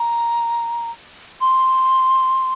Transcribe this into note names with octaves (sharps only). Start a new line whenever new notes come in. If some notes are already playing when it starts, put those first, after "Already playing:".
Already playing: A#5
C6